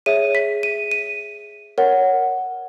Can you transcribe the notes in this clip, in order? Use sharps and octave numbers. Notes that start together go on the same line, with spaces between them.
G#4 C#5 E5 D#7
B6
D#7
D#7
A#4 C#5 F#5